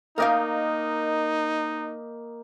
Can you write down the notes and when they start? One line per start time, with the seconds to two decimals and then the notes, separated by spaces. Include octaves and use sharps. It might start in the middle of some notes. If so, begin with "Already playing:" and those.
0.18 A#3 D#4 A#4 D5 D#5 F5 G5